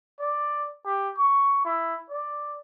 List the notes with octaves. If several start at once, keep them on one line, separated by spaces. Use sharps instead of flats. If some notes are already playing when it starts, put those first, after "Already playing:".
D5
G4
C#6
E4
D5